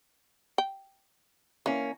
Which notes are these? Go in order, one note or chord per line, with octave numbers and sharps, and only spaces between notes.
G5
E3 A#3 C#4